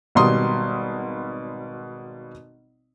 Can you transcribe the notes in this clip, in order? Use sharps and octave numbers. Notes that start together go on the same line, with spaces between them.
G#1 B2 G3 C6 D#6